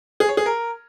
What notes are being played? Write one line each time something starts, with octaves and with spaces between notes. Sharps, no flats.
G#4
C#5
G#4
A#4